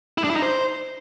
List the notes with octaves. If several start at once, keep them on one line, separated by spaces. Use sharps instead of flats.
E4
D4
E4
D#4
C5